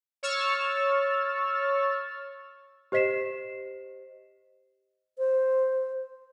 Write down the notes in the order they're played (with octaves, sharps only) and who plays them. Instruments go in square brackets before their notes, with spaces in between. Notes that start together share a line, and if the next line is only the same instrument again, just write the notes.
[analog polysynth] C#5 C#6 E6 F6 A6
[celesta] G4 C5 D#5 B6 C7 E7
[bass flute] C5